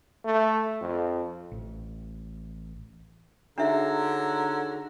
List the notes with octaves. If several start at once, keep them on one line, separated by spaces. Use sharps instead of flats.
A3
F2
A1
D3 D4 D#4 F#4 G#4 C#5 E5 A#5